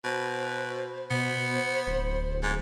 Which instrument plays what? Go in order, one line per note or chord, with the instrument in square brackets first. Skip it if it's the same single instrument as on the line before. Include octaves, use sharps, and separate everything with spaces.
[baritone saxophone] B2 [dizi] C5
[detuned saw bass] B2 [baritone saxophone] B3 [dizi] C5
[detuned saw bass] D1
[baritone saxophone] G#2